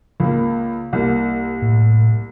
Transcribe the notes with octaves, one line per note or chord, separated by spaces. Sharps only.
C#2 A#3
C2 A#3
A2